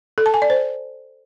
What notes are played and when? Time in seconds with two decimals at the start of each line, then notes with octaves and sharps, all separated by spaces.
0.18 A4
0.26 A5
0.34 G#5
0.42 D5
0.50 C5